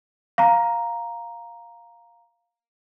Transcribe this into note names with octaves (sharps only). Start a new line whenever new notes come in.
F5 A#5